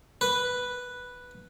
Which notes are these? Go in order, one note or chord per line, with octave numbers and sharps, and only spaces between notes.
B4